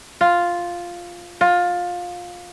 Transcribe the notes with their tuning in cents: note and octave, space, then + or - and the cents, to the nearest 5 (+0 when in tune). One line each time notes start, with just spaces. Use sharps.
F4 +0
F4 +20